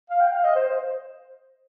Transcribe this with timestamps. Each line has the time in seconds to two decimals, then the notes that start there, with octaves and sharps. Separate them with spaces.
0.10 F5
0.21 G5
0.32 F5
0.44 D#5
0.55 C5
0.66 C5